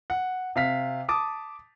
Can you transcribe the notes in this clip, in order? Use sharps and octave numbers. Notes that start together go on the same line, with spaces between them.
F#5
C3 F5 B6
A5 D6 D#6